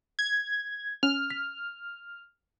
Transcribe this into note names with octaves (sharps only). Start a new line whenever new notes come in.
G#6
C#4 F6
B6